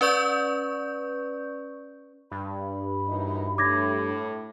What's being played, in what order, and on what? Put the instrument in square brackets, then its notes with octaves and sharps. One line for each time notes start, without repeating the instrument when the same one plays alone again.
[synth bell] C#4 B4 D5 C#6 G6
[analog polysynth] G2 [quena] B5
[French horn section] F#2 E3 D#4
[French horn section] A2 [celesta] D6 G#6 A#6